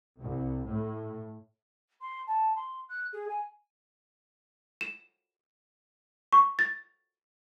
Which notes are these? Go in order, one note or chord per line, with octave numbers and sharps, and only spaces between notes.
C2
A2
C6
A5
C6
F#6
G#4
G#5
E7
C#6
A6